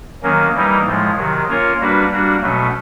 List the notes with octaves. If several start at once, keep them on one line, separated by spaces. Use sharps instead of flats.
D#3 F#3 A#3 C#4
E3 G3 A#3 D#4
A2 F3 G#3
C3 D#3 F#3
A#3 C#4 F4 A#4 C#5
G3 A#3 D4 F#4 B4
G3 A#3 D4 F#4
B2 F#3 A3 C#4